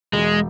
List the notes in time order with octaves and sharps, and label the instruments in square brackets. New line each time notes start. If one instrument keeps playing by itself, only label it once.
[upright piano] E1 [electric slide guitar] G#3